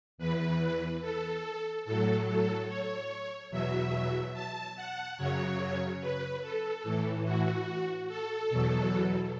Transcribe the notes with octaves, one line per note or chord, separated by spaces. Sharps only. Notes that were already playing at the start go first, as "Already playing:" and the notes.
E2 E3 B4
A4
A2 F#3 A4
A4
C#5
E2 B2 F#3 E5
A5
F#5
F#2 C#3 F#3 C#5
B4
A4
A2 E3
F#4
A4
E2 B2 F#3